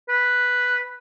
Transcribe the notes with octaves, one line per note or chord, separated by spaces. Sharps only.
B4